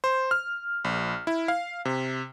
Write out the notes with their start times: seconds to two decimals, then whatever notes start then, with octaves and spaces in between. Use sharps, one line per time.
0.04 C5
0.31 F6
0.84 A#1
1.27 E4
1.48 F5
1.85 C3